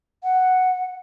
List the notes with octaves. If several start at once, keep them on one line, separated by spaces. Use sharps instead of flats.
F#5